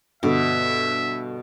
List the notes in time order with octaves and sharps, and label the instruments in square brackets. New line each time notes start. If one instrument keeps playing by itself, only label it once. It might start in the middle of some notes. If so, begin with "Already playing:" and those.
[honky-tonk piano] G2 D3 [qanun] B2 [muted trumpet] E5